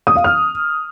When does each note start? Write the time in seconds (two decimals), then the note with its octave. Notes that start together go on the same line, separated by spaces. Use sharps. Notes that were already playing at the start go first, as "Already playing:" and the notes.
0.07 D#6
0.16 F5
0.24 F6